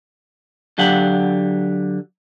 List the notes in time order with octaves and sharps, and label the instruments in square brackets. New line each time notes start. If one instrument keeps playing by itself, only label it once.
[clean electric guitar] D3 F#3 G4 F5 F#5